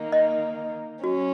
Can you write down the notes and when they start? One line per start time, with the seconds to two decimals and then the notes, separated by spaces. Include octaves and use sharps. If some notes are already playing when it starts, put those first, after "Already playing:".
Already playing: D#3 A#3 D#4
0.12 D#5
1.03 F#3 C#4 F#4